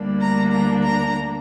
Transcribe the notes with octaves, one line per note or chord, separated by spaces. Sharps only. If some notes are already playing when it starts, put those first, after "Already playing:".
Already playing: D2 D3 G3 A#3 D4
A#5
A#5
A#5